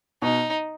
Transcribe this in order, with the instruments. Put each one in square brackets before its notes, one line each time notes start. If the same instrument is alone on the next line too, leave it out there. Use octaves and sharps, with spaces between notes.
[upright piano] B2 [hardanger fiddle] D#4